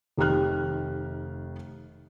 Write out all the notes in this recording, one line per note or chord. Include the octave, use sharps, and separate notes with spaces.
F1 D#3 G4 F6 F#6